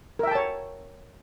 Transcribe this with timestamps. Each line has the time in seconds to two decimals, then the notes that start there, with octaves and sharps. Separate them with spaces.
0.19 A#4
0.23 E5
0.27 G5
0.31 A5
0.35 C#5